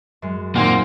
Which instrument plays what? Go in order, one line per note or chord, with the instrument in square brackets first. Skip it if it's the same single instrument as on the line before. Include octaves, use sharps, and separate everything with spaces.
[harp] F#2 G#3
[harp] D#1 A6 [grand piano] A#2 D#3 C4 [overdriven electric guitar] A#3 [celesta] F#5 C6